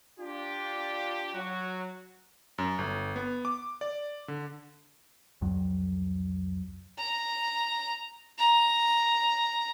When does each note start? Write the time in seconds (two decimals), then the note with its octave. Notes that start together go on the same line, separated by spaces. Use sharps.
0.19 D4 F4 G4
1.34 F#3 F#4
2.58 F#2
2.79 G1
3.16 B3
3.45 D6
3.81 D5
4.28 D3
5.41 C2 F2 F#3
6.98 A#5
8.38 A#5